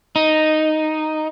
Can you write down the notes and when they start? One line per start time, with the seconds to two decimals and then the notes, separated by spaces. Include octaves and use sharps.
0.16 D#4